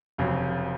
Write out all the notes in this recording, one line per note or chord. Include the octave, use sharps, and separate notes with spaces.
F1 F2 C#3 F#3